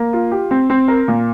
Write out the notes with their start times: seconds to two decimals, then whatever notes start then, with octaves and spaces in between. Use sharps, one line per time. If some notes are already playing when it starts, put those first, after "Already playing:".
Already playing: A#3
0.13 F4
0.31 G4
0.51 C4
0.70 C4
0.88 A#4
1.08 A#2